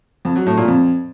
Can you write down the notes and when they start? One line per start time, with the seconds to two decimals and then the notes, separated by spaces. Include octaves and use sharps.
0.25 F2
0.36 F#3
0.46 A2
0.57 A#2
0.68 F2